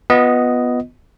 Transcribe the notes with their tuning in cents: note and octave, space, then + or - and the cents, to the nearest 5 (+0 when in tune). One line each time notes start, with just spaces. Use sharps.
B3 +0 F4 +15 D#5 +0